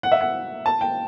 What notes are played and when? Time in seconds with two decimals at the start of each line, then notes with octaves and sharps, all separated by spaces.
0.03 F#5
0.12 E5
0.21 F#5
0.66 A5
0.81 G5